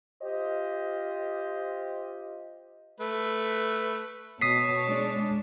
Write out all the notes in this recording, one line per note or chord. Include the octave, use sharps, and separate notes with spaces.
F4 G4 C5 D#5
A3 B4
B2 C#5 A5 D#6 B6 C7
G#3 D4